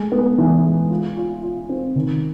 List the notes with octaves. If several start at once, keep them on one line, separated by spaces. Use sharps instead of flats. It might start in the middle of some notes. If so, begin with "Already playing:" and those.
Already playing: G#3 A3
B3
E3
G#3
F4
F4
F4
C4
D#3